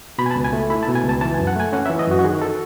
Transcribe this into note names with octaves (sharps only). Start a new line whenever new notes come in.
B2 B5
G#5
A5
C#2
G#5
A3
E4 B5
A5
B2
G#5
C#2
A5
E3 A5
G#5
F#2
F#5
A3 G#5
C#4 F#5
E5
E3
D#5
F#2 F#4
F#4
D#3 G#4
A4